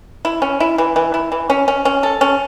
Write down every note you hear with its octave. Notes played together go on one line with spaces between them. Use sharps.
E4
C#4
E4
E3
E3
E4
E3
C#4
C#4
C#4
A4
C#4